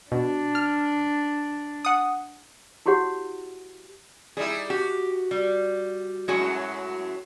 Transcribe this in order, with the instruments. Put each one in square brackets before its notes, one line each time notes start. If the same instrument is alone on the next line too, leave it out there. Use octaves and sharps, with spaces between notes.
[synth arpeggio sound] B2 [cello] D4
[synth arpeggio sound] F6
F#5 D#6
[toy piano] E4 F#4 G4 C#5 F#5
[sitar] G3 D#4 E4 [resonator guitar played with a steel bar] G#4
[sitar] F#4 [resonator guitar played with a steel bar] G4
[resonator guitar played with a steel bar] G3
[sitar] F#2 A2 F#3 [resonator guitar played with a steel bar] G#3 F#4 G#5